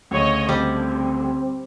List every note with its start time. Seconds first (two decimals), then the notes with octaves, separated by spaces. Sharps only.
0.11 D2 C#3 C#5 D#5
0.49 D3 G3 C4